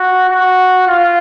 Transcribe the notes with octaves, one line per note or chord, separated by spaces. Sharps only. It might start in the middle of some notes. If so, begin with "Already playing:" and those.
Already playing: F#4
F#4
F4